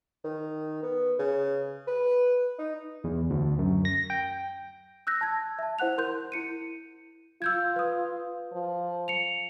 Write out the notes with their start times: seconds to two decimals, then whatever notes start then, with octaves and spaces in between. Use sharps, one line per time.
0.24 D#3
0.83 B3
1.19 C#3
1.87 B4
2.59 D#4
3.04 E2
3.30 D2
3.59 F#2
3.85 A#6
4.10 G5
5.07 E6 F#6 G6 A#6
5.21 A5 G#6
5.59 E5 A5
5.79 E4 C5 F#5 F#6 F7
5.98 A#4 C6 G6
6.32 E4 C#7 D#7
7.42 F4 E6 G6 G#6
7.76 B4 D#6
8.53 F3
9.08 C#7 F7